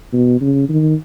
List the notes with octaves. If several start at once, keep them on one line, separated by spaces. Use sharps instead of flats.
B2
C#3
D#3